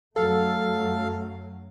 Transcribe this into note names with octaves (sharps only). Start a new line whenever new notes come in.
F#2 F#3 A3 A4 F5